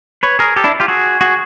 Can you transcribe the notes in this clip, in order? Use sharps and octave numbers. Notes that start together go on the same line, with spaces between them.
B4 C#5
G#4 A#4
G4 A4
D4 E4
F4 G4
F#4 G#4
F#4 G#4